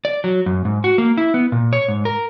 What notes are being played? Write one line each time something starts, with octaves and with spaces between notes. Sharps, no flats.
D5
F#3
F#2
G#2
F#4
A#3
E4
B3
A#2
C#5
G#2
A#4